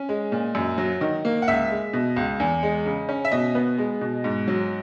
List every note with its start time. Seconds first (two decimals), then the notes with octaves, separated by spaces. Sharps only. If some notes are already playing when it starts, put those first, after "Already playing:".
Already playing: C#4
0.09 G#3
0.32 A#2
0.55 F#2
0.78 F#3
1.01 D#3
1.25 A#3
1.42 F#5
1.48 C#2 E5
1.70 G#3
1.93 B2
2.16 C#2
2.40 E2
2.63 G#3
2.86 C#3
3.09 C#4
3.25 E5
3.32 B2 D#5
3.55 B3
3.78 G#3
4.01 B2
4.24 G#2
4.48 F#3